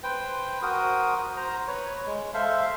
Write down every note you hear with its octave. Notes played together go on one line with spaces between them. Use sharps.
B4 C5 G5
F#4 A#4 C5 D#6
C5 A#5
B4 C#5
G#3
A4 C5 E5 F5